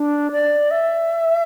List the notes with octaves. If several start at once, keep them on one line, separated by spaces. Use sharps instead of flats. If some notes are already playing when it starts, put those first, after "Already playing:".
Already playing: D4
D5
E5